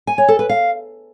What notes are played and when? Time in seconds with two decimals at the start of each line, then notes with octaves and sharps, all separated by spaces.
0.07 G#5
0.18 C#5
0.28 A4
0.39 B4
0.49 F5